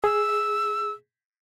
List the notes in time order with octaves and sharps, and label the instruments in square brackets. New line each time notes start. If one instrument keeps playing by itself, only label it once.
[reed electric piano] G#4 [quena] E6